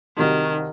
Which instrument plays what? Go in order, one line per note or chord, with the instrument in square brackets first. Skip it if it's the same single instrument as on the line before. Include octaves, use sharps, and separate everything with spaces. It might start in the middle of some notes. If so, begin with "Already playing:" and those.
[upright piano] C2 C3 F#3 [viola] D#3